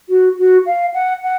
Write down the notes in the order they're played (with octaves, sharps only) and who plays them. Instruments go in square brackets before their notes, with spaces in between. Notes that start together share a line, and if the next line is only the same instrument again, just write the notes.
[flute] F#4
F#4
F5
F#5
F#5